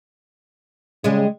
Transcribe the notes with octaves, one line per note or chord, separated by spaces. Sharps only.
C#3 G3 G#3